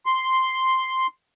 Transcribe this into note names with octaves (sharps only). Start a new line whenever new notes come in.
C6